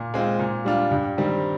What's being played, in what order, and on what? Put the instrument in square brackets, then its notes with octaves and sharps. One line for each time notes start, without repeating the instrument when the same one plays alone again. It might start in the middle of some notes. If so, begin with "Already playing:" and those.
Already playing: [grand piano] A#2
G#3 C4 F4
A#2
G3 D4 F4
G2
D#3 G3 C4